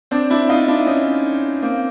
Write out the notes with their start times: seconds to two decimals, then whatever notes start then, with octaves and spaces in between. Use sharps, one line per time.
0.11 C4 D4
0.30 D4 E4
0.49 D#4 F4
0.68 D4 E4
0.87 C#4 D#4
1.62 A#3 C4